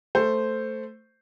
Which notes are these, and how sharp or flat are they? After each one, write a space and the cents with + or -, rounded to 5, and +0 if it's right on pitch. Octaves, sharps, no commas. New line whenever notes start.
A3 +5 C5 -5